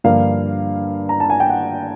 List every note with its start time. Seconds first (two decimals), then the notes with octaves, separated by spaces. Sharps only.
0.04 G2 D3 F3 A#3 F5
1.09 A#5
1.20 A5
1.30 G#5
1.40 G5
1.50 F#5